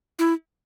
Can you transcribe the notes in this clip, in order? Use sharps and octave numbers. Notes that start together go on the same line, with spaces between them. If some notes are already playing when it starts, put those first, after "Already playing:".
E4